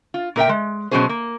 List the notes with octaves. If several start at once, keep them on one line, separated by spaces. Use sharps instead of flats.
F4
A#2 A#4 E5 G5
G#3
B2 F#3 C#4 G#4 C5
A#3